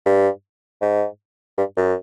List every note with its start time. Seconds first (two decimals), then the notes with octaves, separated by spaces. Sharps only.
0.06 G2
0.82 G#2
1.58 G2
1.77 F#2